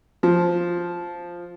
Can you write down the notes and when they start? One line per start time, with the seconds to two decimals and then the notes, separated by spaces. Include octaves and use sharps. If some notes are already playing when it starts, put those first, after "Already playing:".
0.23 F3